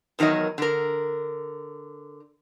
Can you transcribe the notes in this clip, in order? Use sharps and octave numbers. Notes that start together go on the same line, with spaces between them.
E2 D#3 F#3 A#4 D#5
D3 A#4